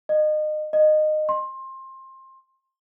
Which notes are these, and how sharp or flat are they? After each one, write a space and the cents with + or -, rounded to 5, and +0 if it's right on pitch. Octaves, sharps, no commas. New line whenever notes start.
D#5 -30
D#5 -20
C6 +20